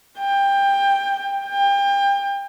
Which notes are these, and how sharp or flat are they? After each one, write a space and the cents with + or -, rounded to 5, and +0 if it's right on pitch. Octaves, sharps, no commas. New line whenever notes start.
G5 +20
G5 +30